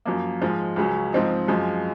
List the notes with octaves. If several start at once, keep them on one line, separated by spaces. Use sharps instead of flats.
F#2 F3 A#3
G#2 F3 G#3
C#2 C#3 F#3 C#4
G#2 F3 C4 D#4
F#2 F3 G#3